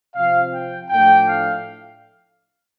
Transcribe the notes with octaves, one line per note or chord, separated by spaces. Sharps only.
C3 F3 C4 F5
G5
A2 F3 A3 D4 G5
F5